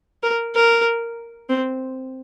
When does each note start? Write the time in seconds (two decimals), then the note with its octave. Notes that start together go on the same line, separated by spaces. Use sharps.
0.23 A#4
0.55 A#4
1.49 C4